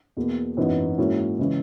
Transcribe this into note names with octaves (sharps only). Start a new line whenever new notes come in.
E2 B2 A#3
G#1 F#2 E3 B3 D#4
G#2 F#3 A#3 C#4 E4
C#3 E3 G#3